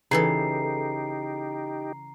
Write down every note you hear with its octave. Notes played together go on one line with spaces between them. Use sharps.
C#3 E3 D#4 G4 A4 A#5 C7